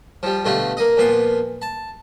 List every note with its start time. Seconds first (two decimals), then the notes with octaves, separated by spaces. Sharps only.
0.23 F3 G3
0.45 B2 D3 A3 F4 G4
0.77 A#3 D#5
0.97 A#2 F3 B3 C6
1.62 A5